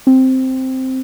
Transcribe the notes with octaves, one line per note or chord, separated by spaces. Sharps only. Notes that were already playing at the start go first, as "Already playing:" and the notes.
C4